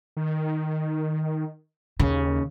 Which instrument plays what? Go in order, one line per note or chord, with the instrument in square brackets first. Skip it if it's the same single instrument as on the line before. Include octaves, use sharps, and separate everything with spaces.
[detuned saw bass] D#3
[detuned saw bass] D#2 [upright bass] C#3